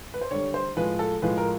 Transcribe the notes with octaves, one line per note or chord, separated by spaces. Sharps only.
B4
C5
D3 G3 C#5
C5
A2 F3 G#3 B4
A4
A2 F3 G#3 B4
A#4